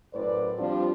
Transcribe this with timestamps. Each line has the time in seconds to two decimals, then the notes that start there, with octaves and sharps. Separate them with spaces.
0.14 F#2 A2 B4 C5 D5
0.58 F3 G3 C4 D4 F4